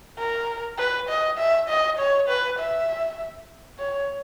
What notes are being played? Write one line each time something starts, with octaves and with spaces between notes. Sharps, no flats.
A#4
B4
D#5
E5
D#5
C#5
B4
E5
C#5